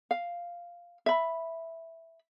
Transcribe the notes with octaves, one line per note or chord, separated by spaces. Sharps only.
F5
E5 B5